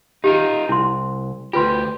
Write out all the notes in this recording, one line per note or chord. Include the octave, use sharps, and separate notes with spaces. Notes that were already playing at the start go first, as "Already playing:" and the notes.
D#4 F4 G4 A#4
C2 E4 C6
D2 F4 G4 B4 C6